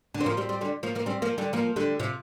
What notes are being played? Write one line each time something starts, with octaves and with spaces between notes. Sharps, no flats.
D3
C4
F3 A#3
G3 C4
G3 C4
D3 G3
F3 A#3
F3 A#3
G3 C4
F3 A#3
D3 G3
F3 A#3
D3 G3
C3 F3